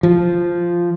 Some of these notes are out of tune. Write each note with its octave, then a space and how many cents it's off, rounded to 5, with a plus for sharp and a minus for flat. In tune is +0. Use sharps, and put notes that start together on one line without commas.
F3 -5